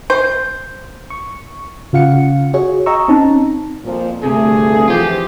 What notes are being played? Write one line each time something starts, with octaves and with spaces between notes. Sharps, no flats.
C5
C#6
C#3 F4 F5 F#5 C#7
F#4 G#4 C#5
D#5 G5 A#5 C#6 E6
C4 C#4 D#4 A5 A#5
F2 A#2 F3
D2 G2 C3 A3 G#4
E3 F3 F4 G4